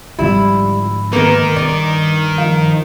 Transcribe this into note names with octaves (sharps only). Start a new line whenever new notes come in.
G#2 D3 F3 G3 E4 F4
D#3 A#3 B3 D#4 A#4 B4
G2 D5
F3 F5